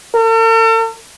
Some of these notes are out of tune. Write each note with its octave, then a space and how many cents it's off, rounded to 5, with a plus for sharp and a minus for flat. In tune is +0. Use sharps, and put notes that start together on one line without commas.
A4 +45